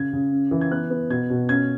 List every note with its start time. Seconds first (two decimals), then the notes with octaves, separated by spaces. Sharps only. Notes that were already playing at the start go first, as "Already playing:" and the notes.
Already playing: C#3 G#6
0.13 C#3
0.32 C#4
0.51 E3
0.61 G#6
0.71 B3 F#6
0.90 B3
1.10 B2 G#6
1.30 B2
1.49 C#4 G#6